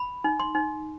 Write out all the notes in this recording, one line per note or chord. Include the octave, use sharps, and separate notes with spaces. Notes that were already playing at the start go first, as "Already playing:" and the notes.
Already playing: B5
D#4
C6
D#4